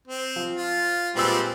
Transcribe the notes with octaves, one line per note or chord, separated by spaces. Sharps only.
C4
F3
F4
A#2 G3 G#3 C4 B4 E6